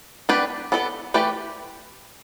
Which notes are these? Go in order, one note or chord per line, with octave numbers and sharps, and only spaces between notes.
B3 D4 G4 B4 D5
B3 D4 A4 D5
E3 A3 G4 B4 D5